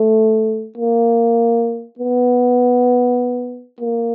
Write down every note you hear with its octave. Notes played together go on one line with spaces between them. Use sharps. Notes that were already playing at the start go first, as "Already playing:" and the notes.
Already playing: A3
A#3
B3
A#3